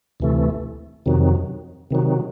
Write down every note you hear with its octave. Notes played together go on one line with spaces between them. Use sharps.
D2 C3 E3 A3
F2 C3 D#3 F#3
C3 D#3 F#3